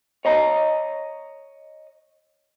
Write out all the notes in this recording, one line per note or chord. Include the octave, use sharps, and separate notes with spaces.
C#5 D#5 A#5